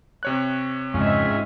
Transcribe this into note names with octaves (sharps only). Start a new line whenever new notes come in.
C3 C#5 F#6
F2 G#2 C#3 C#4 D#4 F4 G#4 E5